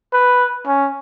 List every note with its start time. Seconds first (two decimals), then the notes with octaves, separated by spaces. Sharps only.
0.13 B4
0.67 C#4